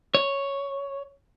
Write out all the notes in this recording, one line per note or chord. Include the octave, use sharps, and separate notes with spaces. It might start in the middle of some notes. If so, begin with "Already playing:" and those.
C#5